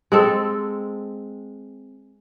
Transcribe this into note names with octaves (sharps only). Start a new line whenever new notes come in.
G#3 C4 A4